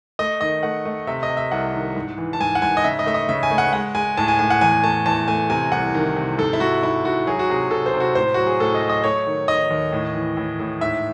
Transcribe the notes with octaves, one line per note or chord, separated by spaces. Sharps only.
A3 D#5
D#3 D#5
A3 F#5
A3
C3 E5
D#5
C3
E5
C2 F#5
D#3
G#2
E3
A5
G#2 G#5
F#5
G#2 G#5
D#5
C#3 E5
D#5
A3 E5
D#5
C#3 E5
G#5
A3
F#5
G#3 F#5
G#3 G#5
A2 A5
G#5
A2 G#5
F#5
E2 G#5
A3 A5
E2 A5
A3 G#5
C3 G#5
C2 F#5
D#3
C3
G#2 A4
E4
G#2 F#4
G#2 E4
G#2 F#4
F#3 G#4
F#4
C3 G#4
C3 A4
C5
C3
F#4
A2 C5
F#3 F#4
G#4
A2 A4
D#5
F#3
D#5
A3 C#5
D#3
D#3 D#5
D#2
A2
E3
A2
A2
G#2 E5